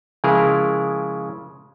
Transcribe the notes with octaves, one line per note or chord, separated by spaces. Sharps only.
C#3 F3 G#3 E4 G#4 A#4